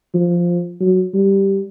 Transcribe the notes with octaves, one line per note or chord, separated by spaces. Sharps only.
F3
F#3
G3